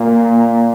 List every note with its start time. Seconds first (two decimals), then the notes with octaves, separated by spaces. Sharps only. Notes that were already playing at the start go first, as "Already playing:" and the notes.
Already playing: A#2 A#3